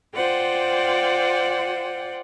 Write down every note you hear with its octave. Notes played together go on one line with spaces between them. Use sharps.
F4 C5 D5 F#5 G5